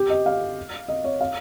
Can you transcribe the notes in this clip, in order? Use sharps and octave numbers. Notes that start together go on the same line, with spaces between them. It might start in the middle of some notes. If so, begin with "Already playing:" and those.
Already playing: G4
D#5
F5
D#5
C#5
F5